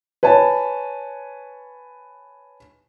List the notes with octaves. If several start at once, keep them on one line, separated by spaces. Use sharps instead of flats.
B4 C#5 G#5 A5